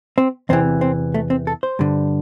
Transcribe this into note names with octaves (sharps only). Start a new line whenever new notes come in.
C4
E2 C3 E3 C4
C4
A3
C4
A4
C5
G2 D3